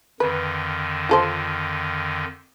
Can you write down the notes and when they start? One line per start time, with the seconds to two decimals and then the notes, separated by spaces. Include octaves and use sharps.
0.20 F2 D3 D#3 B4
1.09 F4 A4 C5